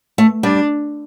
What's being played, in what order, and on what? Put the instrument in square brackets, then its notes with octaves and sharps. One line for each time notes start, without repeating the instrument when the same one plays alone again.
[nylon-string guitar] A3
[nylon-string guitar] G3 [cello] D4